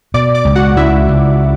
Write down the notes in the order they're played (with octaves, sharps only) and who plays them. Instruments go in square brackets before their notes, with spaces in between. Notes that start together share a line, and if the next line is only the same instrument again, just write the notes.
[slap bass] B2 [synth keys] D5 D6
[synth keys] D5 D6
[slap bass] C#2
[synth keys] F#4 F#5
[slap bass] C#2 [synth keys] E4 E5
[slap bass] C#2